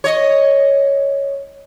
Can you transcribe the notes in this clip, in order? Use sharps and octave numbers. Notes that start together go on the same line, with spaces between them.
C#5 D#5